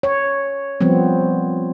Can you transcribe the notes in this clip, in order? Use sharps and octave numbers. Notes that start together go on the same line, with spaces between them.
C#5
F3 G3 B3 C4